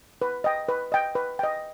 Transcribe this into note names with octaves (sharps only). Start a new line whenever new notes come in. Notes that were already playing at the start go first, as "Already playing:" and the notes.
B4
D#5 G5
B4
D#5 G5
B4
D#5 G5